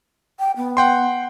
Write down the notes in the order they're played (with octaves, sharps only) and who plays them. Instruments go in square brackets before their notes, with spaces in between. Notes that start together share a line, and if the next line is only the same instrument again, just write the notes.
[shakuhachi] G5
B3
[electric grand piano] F#5 G5 C6